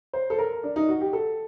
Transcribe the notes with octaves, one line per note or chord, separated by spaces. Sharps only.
C5
A4
A#4
D4
D#4
F#4
G4
A4